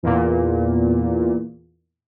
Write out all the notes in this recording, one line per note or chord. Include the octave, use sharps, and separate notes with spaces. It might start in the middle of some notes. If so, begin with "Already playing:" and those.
E2 A#2